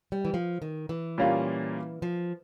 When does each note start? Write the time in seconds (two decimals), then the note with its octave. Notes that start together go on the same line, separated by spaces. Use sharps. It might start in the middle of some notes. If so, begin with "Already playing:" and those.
0.12 G3
0.25 E3
0.34 F3
0.62 D#3
0.89 E3
1.18 A#2 G3 A#3 C#4 F4
2.02 F3